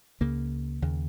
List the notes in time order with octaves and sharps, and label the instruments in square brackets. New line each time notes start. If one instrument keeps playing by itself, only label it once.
[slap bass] C#2 C#3 A#3
D#2 C#3